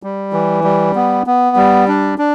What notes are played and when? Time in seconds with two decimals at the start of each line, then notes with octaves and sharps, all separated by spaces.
0.03 G3
0.33 E3
0.64 G3
0.96 B3
1.27 B3
1.56 G3
1.88 D4
2.18 D4